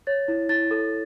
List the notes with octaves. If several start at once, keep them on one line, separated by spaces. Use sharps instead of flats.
C#5 A6
E4
E4 A6
A4